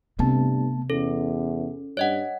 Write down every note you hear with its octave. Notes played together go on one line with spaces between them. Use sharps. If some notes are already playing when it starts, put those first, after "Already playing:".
G2 C3 A3 B3 A5
E2 C#4 A4
G2 C#5 D#5 F#5